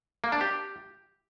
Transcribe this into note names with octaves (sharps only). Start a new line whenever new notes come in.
A#3
D4
G4